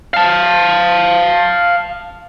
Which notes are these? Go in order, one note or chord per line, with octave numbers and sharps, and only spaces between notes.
F5 A5